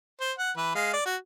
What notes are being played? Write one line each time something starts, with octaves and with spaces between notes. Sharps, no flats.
C5
F#5
E3 B4
G#3 F5
D5
F#4